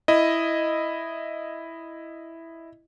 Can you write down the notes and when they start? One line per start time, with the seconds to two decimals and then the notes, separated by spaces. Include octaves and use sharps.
0.08 E4 D#5